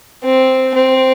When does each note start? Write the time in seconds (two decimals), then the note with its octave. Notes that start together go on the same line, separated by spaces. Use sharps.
0.24 C4
0.74 C4